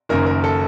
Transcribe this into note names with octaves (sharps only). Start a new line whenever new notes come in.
F#1 F#2 D#3 A#4
A#4
A4